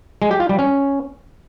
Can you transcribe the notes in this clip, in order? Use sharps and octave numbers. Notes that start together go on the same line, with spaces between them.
G#3
G4
F4
G3
C#4